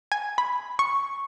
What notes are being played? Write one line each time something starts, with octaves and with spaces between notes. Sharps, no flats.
G#5
B5
C#6